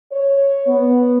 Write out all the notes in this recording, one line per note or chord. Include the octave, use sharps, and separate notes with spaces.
C#5
B3